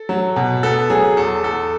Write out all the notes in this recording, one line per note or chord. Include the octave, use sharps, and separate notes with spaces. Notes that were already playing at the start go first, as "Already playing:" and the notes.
Already playing: A4
F#3
B2
B3 A4
F#3 G#4
E2 A4
E2 A4